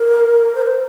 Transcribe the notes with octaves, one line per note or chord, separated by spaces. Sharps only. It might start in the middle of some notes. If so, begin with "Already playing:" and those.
Already playing: A#4
C5
A#4
C5